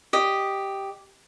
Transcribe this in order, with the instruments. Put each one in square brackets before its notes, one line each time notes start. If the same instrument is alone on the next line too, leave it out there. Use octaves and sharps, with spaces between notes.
[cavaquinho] G4 D#5